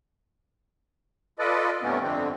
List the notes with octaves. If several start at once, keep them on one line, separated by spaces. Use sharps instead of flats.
F4 A4 B4 D5 D#5
G2 C3 A3 B3 C#4
F2 D3 C4